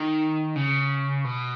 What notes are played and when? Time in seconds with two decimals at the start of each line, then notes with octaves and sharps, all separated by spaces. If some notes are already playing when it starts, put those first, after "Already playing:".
Already playing: D#3
0.56 C#3
1.24 B2